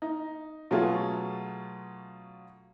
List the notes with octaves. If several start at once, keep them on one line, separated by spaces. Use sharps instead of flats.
D#4
B2 F#3 A3 C#4 F4 G#4